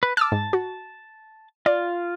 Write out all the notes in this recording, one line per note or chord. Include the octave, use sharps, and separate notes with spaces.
B4
A5 D6 E6 F6
G#2
F#4
F4 D5